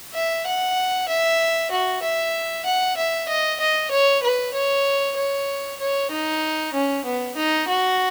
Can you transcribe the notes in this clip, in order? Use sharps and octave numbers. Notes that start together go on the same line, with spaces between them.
E5
F#5
E5
F#4
E5
F#5
E5
D#5
D#5
C#5
B4
C#5
C#5
C#5
D#4
C#4
B3
D#4
F#4